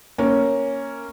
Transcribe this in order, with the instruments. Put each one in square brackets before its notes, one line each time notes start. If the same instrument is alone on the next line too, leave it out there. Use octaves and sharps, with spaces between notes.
[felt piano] A#3 C#4